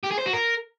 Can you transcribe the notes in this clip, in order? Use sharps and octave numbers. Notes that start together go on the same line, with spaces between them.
G4
G#4
C5
F#4
A#4